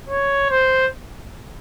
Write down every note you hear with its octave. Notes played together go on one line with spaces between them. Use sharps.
C#5
C5